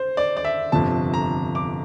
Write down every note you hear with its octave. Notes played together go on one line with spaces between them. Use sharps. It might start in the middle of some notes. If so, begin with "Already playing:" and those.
Already playing: C5
D5
D5
E5
G1 F2 C3 F3 A5
A#5
D6